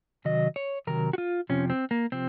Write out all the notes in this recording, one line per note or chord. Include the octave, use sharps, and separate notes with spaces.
C3 D#3 F#3 D#5
C#5
C3 D#3 F#3 A#4
F#4
F4
F2 C3 F3 C#4
C4
A#3
C3 F3 C4